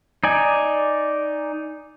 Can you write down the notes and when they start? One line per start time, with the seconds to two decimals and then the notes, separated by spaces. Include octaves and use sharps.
0.24 D#4 D5 G#5